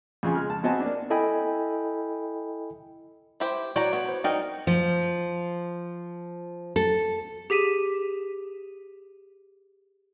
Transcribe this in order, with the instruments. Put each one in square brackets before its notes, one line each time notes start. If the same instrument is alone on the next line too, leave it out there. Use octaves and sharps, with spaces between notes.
[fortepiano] F2 C#3 F4 G#5
G#3 F6
A5
B3 C4 F#4 D#5 G#5 A5
A#3 D4
[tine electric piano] E4 A4 D#5 G5 G#5 B5
[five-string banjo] E4 G4 C5
[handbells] E4 [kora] F#4 C#5 G5 [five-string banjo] D5 A#5
[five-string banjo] B3 [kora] C#5
[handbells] C5
[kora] D#4 A#4 [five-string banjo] F#4 [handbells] D5 G5
[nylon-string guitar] F3
A4
[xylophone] G4 G#4 B6 D#7 E7